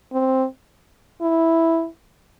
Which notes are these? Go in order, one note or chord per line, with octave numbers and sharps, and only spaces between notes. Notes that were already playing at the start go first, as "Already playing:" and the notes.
C4
E4